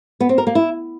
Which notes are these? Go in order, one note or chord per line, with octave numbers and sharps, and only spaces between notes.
B3
C4
A#4
A#3
E4